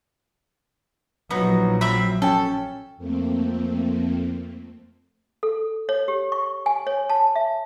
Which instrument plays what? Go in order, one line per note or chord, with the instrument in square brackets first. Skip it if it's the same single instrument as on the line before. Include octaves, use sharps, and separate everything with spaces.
[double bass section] A#1 F3 F#3 [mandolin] B3 D#4
[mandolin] C4 E5 B5
[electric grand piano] C#4 G5 [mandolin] A4
[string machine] F2 A3 A#3 C4
[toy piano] A4
C#5
G4
C#6
G#5
C#5
A5
E5